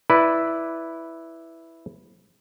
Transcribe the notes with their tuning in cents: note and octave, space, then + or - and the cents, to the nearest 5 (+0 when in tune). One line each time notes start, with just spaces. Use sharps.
E4 +0 B4 +0 D5 +0